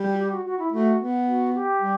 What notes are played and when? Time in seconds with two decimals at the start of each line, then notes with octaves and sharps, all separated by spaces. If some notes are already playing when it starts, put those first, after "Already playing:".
Already playing: G3
0.14 F#4
0.18 G4
0.32 F#4
0.45 F#4
0.59 E4
0.72 A3 F#4
1.00 B3
1.27 F#4
1.55 G4
1.81 G3